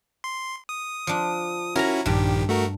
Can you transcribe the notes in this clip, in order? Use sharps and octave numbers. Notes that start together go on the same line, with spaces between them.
C6
D#6
F3 D4
C#4 E4 F#4 A#4 A#5
A#1 G2 D#3 G4
A3 F#4 A#4